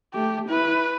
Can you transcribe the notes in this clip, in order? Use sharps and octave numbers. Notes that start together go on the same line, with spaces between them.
A3 G4
E4 B4